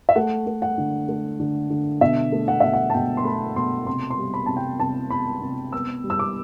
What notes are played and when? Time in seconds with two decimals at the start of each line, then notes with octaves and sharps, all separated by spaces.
0.09 E5
0.15 A3 F#5
0.47 A3
0.62 F#5
0.78 D3
1.09 A3
1.40 D3
1.70 D3
2.01 B2 E5
2.32 A3
2.48 F#5
2.60 B2 E5
2.73 F#5
2.90 A5
2.94 B2 G5
3.17 C6
3.25 A3 B5
3.56 B2 C6
3.87 C3 C6
4.10 C6
4.18 G3
4.34 B5
4.46 C3 A5
4.57 G5
4.80 C3 A5
5.10 B3 B5
5.42 C3
5.72 B3 E6
6.04 G3
6.10 E6
6.19 D6